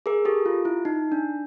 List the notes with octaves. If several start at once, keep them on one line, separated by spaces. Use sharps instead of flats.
G#4 A#4
G4 A4
F4
E4
D#4
D4